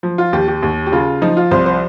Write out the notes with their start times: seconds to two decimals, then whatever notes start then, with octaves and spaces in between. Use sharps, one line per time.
0.03 F3
0.18 F4
0.33 D#2 G4
0.48 G4
0.62 D#2
0.86 G4
0.92 C#3 F4
1.22 F3 D#4
1.37 F4
1.51 C2 C5
1.66 C5